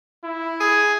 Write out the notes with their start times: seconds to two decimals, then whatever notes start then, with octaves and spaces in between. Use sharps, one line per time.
0.24 E4
0.60 G#4